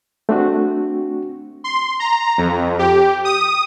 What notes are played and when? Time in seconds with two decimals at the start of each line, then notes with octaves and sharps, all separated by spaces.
0.29 A3 C4 D4 F#4
1.64 C6
2.00 A#5
2.38 F2
2.79 G4
3.25 D#6